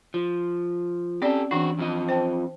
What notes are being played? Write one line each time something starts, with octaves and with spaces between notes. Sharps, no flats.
F3
C4 C#4 G4 A4 D5
E3 C4 D4 F#4
F2 F3 D#5
C5 G5 A5